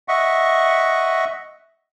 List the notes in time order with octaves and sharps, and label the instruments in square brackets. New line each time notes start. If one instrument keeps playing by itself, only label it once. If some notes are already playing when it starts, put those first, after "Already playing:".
[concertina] D#5 E5 F#5 C#6